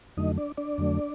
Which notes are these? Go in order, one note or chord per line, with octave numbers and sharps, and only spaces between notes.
F2 D3 F#3 A3 D#4 D#5
D4 D5
D4 D5
F2 D3 F#3 A3